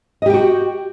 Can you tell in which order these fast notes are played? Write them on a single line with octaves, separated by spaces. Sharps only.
D#5 G4 G5 F#4